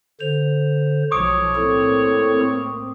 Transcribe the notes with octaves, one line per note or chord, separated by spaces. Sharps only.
D3 C5 F7
B1 F3 C#5 D6 D#6 D7
A2 A#3 C4 E4 A4